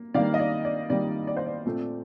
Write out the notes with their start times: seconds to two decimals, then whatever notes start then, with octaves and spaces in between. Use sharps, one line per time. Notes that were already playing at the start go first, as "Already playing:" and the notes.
Already playing: A#3
0.14 D#3 G3 A#3 D5 F5
0.34 D#5
0.39 D5
0.65 D5
0.90 D#3 G3 A#3 D5
1.27 D5
1.37 C5
1.46 D5
1.65 A#2 A3 C4